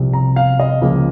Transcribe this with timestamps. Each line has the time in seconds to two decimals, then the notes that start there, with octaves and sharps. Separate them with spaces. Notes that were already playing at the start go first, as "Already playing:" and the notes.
Already playing: C2 C3 F3
0.13 A#5
0.36 F5
0.60 D#5
0.81 C#2 C#3 F3 A#3